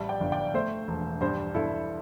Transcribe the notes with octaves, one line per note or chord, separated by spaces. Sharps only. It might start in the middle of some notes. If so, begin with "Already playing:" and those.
Already playing: A1 G3 E5 A5
D5 G5
G1
D5 G5
A3 C5 E5
E1
G2 G4 C5
G2 E4 A4